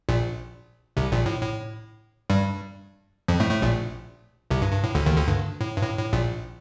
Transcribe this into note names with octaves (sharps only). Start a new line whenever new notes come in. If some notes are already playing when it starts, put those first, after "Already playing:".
A#1 A#2
C2 C3
A#1 A#2
A2
A2
G2 G3
F2 F3
A2 A3
A2 A3
A#1 A#2
C2 C3
G2
G2
A2
D2 D3
D#2 D#3
D2 D3
G2
A2
G2
A2
A2
A#1 A#2